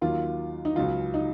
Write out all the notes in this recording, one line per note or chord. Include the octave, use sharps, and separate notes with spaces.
D#2 D#3 F#3 F4
D#4
C#2 C#3 F#3 F4
D#4